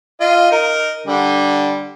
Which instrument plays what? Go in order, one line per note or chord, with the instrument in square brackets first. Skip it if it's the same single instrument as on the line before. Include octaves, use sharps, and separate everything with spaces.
[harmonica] F4 D#5
D#4 A#4
D3 G3